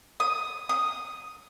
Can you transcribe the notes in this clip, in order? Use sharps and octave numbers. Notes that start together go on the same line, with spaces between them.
D#6
D#6